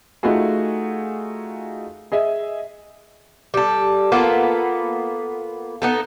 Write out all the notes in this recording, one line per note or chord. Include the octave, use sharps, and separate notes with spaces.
A3 D#4 F4 F#4 G#4
G#4 D#5 E5
G3 A4
A#3 B3 F4 A4
B3 D#4 A4